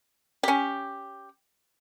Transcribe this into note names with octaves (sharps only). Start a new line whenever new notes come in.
C#4 G4